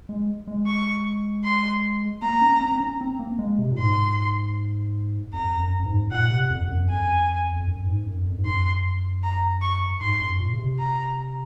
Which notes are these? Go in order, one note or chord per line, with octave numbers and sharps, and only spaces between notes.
G#3
G#3
C#6
C6
A#3 A#5
C#4
C4
C4
C#4
C4
A#3
G#3
C3
A#2
G#2 C6
F2 A#5
F#2
F#2
G#2
A#2 F#5
C3
F2
F2
F#2
F2 G#5
F2
F#2
G#2
F#2
F2
G#2
F#2 C6
A#5
C#6
G#2 C6
F#2
A#2
C#3
C3
A#5